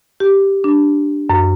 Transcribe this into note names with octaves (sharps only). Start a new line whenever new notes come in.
G4
D4
F#2